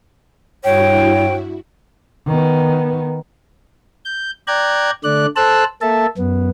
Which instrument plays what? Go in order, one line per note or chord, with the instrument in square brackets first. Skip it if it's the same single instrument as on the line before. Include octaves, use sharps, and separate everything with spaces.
[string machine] G2 E4 F#4 [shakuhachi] C#5 [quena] G5
[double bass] D#3 B3
[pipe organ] G6
D5 G5 A#5 F#6 G#6
D3 A3 D5 F#6
A4 C5 A5 E6 F#6
A#3 A4 E5 A5
F#2 B3